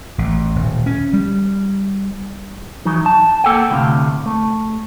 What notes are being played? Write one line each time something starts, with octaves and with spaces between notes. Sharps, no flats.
A1
D#1
C#4
G3
E3 F#3 D#4
A5
A#3 A4 F#5 G5
D2 A2 C3 F5
A3